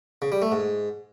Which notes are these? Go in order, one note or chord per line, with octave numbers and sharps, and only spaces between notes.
C#3
G3
A3
G#2